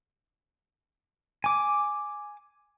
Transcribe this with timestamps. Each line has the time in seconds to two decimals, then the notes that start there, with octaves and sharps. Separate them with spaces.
1.44 G#5 D6